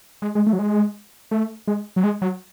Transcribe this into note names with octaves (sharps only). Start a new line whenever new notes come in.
G#3
G#3
A3
F#3
G#3
A3
G#3
F#3
G#3
F#3